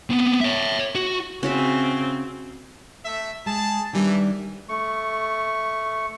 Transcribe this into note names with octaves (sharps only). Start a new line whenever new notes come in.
B3 C4
C#5 E5
F#4
C#3 C4 C#4 F#4 E5
A3 E5
G#3 G#4 A5
D#3 E3 G3 D4
A3 C#6